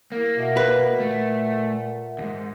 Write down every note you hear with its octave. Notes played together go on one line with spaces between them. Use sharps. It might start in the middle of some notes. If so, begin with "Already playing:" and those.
A#3 E4 A#4
B2 A#4 E5 F#5
B4
A#2 A3
D#2 G#2